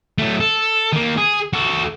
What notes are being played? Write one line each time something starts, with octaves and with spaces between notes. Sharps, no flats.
F#3 A3
A4
D#3 A#3
G#4
F#4 A4